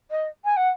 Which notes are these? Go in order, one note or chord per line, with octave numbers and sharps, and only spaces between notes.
D#5
G#5
F#5